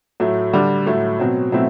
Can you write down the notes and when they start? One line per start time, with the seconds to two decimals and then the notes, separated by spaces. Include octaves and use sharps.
0.20 A2 F#3 A3
0.53 D3 G3 D4
0.86 A2 F#3 A3
1.20 B2 F#3 C4
1.52 B2 F#3 A3 C4 E4